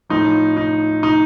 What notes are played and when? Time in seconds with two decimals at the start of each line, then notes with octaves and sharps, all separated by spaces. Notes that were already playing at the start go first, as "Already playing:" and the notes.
0.09 A2 F3 D#4
0.57 D#4
1.03 D#4